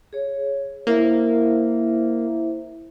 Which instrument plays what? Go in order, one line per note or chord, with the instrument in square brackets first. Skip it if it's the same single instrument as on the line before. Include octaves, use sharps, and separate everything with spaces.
[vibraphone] G#4 C#5
[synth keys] A#3 [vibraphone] E4 C5 E5